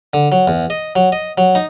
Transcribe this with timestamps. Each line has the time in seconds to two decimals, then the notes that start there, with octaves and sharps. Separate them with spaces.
0.13 D3
0.32 F#3
0.48 E2
0.70 D#5
0.96 F#3
1.12 D#5
1.38 F#3
1.55 D#4